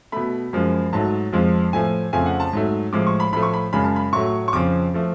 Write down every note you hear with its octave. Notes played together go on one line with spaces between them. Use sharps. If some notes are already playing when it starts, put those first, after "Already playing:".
B2 A3 B5
F#2 F3 G#3
G#2 F#3 A3 A5
F2 F3 G#3
A2 F3 A3 G#5
F2 C#3 F3 A3 G#5
F#5
A5
G#2 F#3 A3
A2 F3 G#3 D6
C#6
B5
A2 F3 A3 B5
C#6
B5
F#2 C#3 G#3 B5
A5
B5
A2 F#3 A3 C#6
C#6
F2 C#3 F3 D6
F3 A3